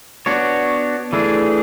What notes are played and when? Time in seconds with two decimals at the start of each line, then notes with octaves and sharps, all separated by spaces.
0.26 B3 D4 F#4 C#5
1.13 E3 A3 D4 G#4